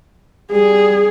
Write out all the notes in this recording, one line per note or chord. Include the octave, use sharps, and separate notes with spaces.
G3 G#4